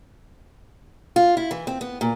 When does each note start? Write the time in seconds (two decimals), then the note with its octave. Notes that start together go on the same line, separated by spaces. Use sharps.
1.16 F4
1.37 E4
1.51 E3
1.67 C4
1.81 B3
2.01 A#2